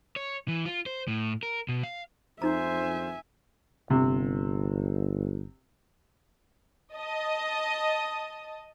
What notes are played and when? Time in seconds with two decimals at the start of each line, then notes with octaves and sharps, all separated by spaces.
0.16 C#5
0.48 E3
0.65 F4
0.86 C5
1.08 A2
1.43 A#4
1.68 B2
1.83 F5
2.42 F2 D#4 C5 E5 G#5 A#5
3.90 G1 C3
6.96 D#5 A5